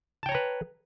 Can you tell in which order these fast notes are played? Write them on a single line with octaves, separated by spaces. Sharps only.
A5 G5 C#5 A#5 B4